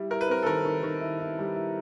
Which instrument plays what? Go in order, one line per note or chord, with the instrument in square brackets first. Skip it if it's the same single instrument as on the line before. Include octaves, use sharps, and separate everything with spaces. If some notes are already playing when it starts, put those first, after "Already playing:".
Already playing: [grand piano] G3 E4
[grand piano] E4 [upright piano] A#4
[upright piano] B4
[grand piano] C4 [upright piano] A#4
[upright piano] A4
[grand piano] D#3 [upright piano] A#4
[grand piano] D#3
D#3
E4
E4
G3
E4